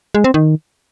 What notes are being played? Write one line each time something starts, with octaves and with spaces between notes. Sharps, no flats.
G#3
C4
D#3